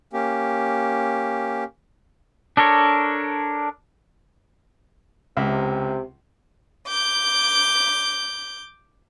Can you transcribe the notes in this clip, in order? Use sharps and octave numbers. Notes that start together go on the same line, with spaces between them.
A#3 C#4 G4
D4 A4 A#4 C#5
C#2 C3 E5
D6 G6